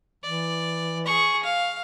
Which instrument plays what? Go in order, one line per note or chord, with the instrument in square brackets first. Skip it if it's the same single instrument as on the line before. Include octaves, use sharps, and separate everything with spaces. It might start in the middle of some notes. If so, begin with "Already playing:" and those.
[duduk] E3 [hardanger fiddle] D5
[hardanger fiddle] G#4 C#6
F5